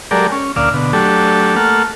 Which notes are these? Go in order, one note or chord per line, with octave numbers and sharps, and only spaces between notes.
F#3 G#3 G4 A4 A#4 D5
C#4
D2 A#2 D5 F5 E6
B2 D3
F#3 A3 D4 G4 A4
A3 A#3 A4 F#5 F6